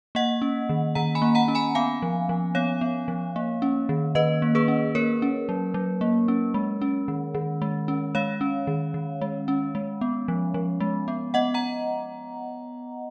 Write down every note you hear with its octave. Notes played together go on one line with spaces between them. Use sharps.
A#3 D#5 F#5
C#4
D#3
D#3 F#5 A#5
G#5 B5
A#3
F#5 A#5
C#4
G#5 B5
B3 F5 G#5
F3
F3
B3 C#5 F5
B3
F3
A#3
C#4
D#3
D#3 B4 D#5
A#3
G#4 B4
C#4
A#3 A#4 C#5
C#4
F#3
F#3
A#3
C#4
G#3
C#4
D#3
D#3
G#3
C#4
G#3 C#5 F5
C#4
D#3
D#3
G#3
C#4
G#3
B3
F3
F3
G#3
B3
B3 D#5 F#5
F#5 A#5